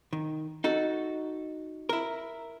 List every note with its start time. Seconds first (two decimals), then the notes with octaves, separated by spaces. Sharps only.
0.13 D#3
0.64 D#4 F#4 A4
1.89 E4 A#4